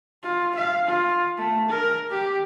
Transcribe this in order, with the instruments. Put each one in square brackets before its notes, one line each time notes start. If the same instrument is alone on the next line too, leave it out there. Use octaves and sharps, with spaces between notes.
[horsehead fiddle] F4
F5
F4
A3
A#4
G4